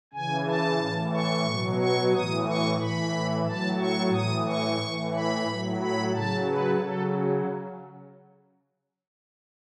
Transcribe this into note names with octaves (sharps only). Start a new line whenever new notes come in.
C#3 E3 G#5
A5
A2
E3
C#6
B2 F#3
C#6
A2 E3 D#6
C#6
A2 E3 B5
A2 F#3 A5
C#6
A2 E3 D#6
C#6
A2 E3
B5
A2 F#3
B5
C#3 F#3 A5
B4
C#3 F#3 A4